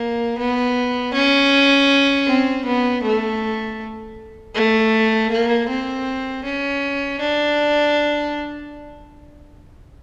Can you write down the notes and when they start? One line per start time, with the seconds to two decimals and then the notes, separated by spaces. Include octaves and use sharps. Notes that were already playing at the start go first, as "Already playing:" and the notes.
Already playing: A#3
0.38 B3
1.14 C#4
2.27 C4
2.65 B3
3.03 A3
4.55 A3
5.31 A#3
5.69 C4
6.44 C#4
7.20 D4